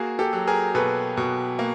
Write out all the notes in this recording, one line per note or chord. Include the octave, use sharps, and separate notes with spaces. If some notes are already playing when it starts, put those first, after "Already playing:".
Already playing: A#3 F#4 G#4
G4 A4
F#3
G#4 A#4
B2 A4 B4
B2
A#3